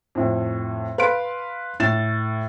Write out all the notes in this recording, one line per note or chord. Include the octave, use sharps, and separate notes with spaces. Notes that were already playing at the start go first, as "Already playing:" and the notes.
F2 A2
B4 F5 C6 D7
A2 A6 E7